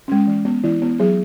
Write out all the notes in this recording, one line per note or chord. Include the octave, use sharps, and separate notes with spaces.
G#3 C#4
E3
B3
E3 E4
B3
F#3 G#4